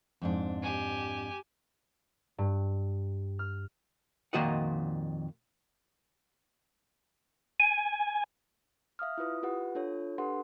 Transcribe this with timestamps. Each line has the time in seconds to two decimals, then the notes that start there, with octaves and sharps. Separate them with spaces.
0.22 F2 G#2 D4
0.62 G4 G#5
2.38 G2
3.39 F6
4.33 F2 A#2 D#3 F#4 D#5 F#5
7.60 G#5
8.99 E5 F5 D#6 F6
9.18 E4 F4 B4 D#6
9.43 F4 G4 B4 F#5
9.75 D4 F4 A4 C#5
10.18 D4 G4 A4 B4 F#5 C6